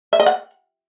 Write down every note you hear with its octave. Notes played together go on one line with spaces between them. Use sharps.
E5
D#5
F#5